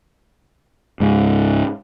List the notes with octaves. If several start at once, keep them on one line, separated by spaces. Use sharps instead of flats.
C#2 G#2